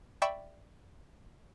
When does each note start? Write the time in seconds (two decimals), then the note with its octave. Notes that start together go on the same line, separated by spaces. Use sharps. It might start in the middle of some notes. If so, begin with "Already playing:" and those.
0.22 D5 E5 G5 B5 C#6 E6